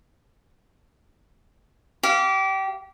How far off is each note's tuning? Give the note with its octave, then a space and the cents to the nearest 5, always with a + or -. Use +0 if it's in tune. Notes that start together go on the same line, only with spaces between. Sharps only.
G4 -25 F5 -15